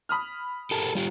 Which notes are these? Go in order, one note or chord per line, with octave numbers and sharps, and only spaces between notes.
B5 D#6 F6
G4 A4 A#4
G3 F4 G4